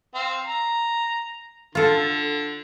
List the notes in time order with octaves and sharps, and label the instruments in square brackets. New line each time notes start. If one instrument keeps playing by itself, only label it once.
[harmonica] C4 F5
A#5
[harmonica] D3 [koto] F4 A4